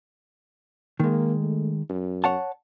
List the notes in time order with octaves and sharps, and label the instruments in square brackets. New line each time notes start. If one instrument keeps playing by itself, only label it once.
[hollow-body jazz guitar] D#3 G#3 [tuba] A#3
[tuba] A3
F#2
[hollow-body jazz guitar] C#5 F#5 A5